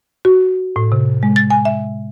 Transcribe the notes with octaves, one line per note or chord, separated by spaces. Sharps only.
F#4
A2
C3
G#3
A6
G#5
E5